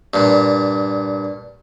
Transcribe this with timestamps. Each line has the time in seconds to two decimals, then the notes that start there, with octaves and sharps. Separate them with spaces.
0.14 G2 A#2